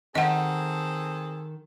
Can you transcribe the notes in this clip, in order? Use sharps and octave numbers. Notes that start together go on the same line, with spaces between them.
D#3 C4 G#4 A4 D#5 F#5